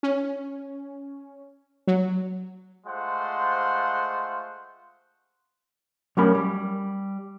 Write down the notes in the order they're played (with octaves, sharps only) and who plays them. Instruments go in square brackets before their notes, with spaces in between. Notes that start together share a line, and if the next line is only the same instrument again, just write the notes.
[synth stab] C#4
F#3
[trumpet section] G#3 A3 F4 C5 F#5
[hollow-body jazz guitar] F#3 G3 A3 C#4 A#4 B5
G3